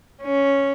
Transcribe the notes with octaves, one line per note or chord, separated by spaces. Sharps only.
C#4